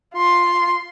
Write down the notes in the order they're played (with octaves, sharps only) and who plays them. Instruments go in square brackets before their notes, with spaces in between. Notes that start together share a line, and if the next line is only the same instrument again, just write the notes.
[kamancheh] F4 C6